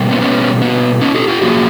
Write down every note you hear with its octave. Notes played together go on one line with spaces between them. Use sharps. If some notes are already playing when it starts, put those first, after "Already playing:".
Already playing: B2 G3 A#3
B3 C#4
B3 C#4
B3
C#4 D#4
G4 A4
F4 G4
A#2 F3 A#3 F#4 G#4